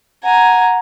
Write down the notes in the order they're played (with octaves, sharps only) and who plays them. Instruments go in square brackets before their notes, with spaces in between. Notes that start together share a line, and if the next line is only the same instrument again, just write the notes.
[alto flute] F#5 [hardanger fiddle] G#5 A#5